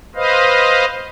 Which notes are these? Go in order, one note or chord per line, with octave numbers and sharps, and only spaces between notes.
B4 C5 D#5 F5